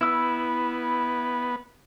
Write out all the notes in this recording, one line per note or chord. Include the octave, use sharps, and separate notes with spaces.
B3 E4 E6